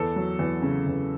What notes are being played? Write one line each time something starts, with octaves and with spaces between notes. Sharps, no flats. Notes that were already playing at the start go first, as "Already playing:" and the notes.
Already playing: E2 A4
F#3
E2
C#3
E2